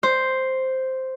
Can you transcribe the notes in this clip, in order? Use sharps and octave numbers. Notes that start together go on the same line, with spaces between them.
C5